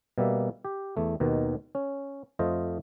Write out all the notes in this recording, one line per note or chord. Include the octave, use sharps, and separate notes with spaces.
B2 G3 A#3 E5
G4
E2 A3
D#2 B2 D#3
C#4
F2 A3 F4 C5 D#5